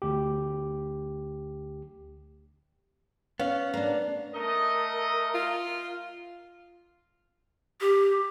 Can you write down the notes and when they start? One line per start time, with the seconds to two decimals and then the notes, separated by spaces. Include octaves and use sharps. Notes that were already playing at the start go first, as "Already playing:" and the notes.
0.02 D2 G4
3.40 B3 C#4 C#5 F5
3.74 A#3 D4 A#5
4.33 A3 A#4 D#5
5.35 F4
7.81 G4